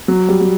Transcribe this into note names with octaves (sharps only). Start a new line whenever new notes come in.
F#3
G3
G3